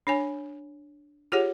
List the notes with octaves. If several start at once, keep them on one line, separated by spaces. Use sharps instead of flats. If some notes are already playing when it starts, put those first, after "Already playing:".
D4 C#5 G#5
F4 G4 G#4 C#5 F#5